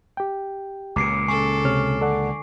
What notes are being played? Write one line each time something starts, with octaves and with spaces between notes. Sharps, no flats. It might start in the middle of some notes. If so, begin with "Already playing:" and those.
G4 G5
C#2 A#2 D6 C7 D7
C#3 A4 G#5 C#6 C7
C3 C#5 F6
D3 A4 D5 F#5